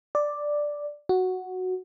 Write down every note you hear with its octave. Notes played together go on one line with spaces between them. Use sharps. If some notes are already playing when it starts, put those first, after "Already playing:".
D5
F#4